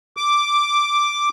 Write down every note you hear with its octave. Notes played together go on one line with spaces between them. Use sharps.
D6